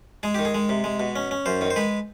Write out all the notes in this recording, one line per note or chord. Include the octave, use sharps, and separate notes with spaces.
G#3 G#4
D#3 G4
G#4
G#3
C3
G#3
B2
C#4
C#4
F#2 C5
D#3
C5
G#3 B4